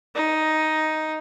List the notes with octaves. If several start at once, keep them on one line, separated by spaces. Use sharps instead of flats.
D#4